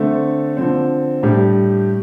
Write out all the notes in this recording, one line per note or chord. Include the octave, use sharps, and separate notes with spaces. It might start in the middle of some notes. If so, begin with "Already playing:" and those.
Already playing: D3 A3 C4
D3 F3 C4
A2 G3 D4 G4